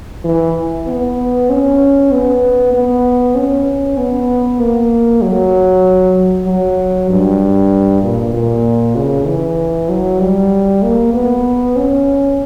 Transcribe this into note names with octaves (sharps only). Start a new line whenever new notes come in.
E3
B3
C#4
B3
B3
C#4
B3
A#3
F#3
F#3
G2
A#2
A#2
C#3
E3
F#3
G3
A#3
B3
C#4